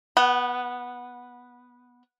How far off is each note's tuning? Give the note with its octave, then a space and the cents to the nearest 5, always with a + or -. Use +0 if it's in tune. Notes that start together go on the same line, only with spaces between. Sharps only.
B3 -10 F#5 +25